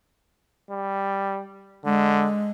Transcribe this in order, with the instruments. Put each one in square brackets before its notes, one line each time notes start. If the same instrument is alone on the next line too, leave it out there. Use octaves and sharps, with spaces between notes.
[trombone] G3
[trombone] D3 [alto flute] G#3